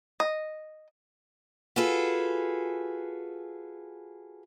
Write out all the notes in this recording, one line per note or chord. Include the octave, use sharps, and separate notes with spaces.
D#5
F4 F#4 G#4 A4 B4